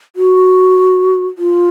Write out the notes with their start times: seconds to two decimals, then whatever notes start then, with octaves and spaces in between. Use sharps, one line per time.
0.16 F#4
1.38 F4